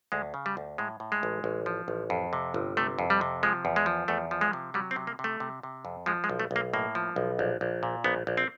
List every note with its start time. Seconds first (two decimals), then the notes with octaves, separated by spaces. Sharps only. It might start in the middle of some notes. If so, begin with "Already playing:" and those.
0.12 D2 G#3
0.34 C#3
0.46 G3
0.57 D2
0.78 A2 G#3
1.00 A2
1.12 G#3
1.23 A1
1.44 A1
1.66 F3
1.88 A1
2.10 F2
2.33 C3
2.54 G1
2.77 C3 A3
2.99 F2
3.10 G3
3.21 C3
3.43 F3 G#3
3.65 E2
3.76 G#3
3.86 F3
4.08 E2 A3
4.31 F3
4.41 G#3
4.53 C3
4.74 F#3 G3
4.91 C4
4.96 C3
5.07 A#3
5.19 C3
5.24 A3
5.40 C3
5.63 C3
5.85 F2
6.06 F3 G#3
6.24 G#3
6.29 B1
6.40 A3
6.51 B1
6.56 A#3
6.73 A2 A#3
6.95 F3
7.16 B1
7.39 A#1
7.61 A#1
7.83 A#2
8.04 A#1 B3
8.27 A#1
8.37 C4